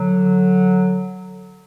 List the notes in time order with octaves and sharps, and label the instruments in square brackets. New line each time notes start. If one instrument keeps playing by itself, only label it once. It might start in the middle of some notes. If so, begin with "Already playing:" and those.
Already playing: [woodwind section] D3 F#3